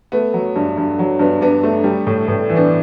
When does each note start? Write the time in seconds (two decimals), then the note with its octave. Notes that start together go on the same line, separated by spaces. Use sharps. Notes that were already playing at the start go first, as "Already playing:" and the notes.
0.12 A3 B3
0.34 F#3
0.56 G2
0.78 G2
0.99 F#3
1.19 G2 B3
1.41 G2 B3 D4
1.63 A3
1.84 G3
2.07 A2
2.27 A2 B3
2.50 E3
2.56 B3 D4